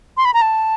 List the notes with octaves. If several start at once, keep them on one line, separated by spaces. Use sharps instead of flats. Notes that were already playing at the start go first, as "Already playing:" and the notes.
C6
B5
A#5
A5